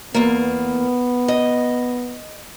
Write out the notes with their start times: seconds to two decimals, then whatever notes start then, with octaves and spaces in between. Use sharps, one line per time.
0.14 E2 A#3 B3
1.28 D#5